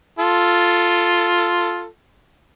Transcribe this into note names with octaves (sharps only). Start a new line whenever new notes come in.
F4 A4